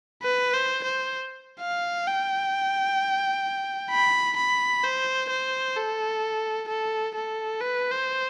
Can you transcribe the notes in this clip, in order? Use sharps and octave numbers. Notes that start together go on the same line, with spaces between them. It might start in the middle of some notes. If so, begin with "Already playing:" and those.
B4
C5
C5
F5
G5
B5
B5
C5
C5
A4
A4
A4
B4
C5